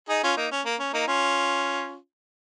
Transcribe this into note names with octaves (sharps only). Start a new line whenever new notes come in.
D#4 G#4
C#4 F4
A#3 D#4
C#4
A#3
C#4
A#3 D#4
C#4 F4